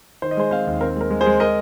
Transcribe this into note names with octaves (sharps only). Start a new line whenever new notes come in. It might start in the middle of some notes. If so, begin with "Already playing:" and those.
D#3 C5
D#5
G#3 G#4 C5
C4 C5 F5
D#2
C4 A#4
G#3 A#4
G#3
G#4 C5
G#3
A#4 D#5